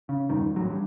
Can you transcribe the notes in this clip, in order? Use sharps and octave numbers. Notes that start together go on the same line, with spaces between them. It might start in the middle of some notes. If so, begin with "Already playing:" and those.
C#3
E1 G2 D#3
A1 F#3
G2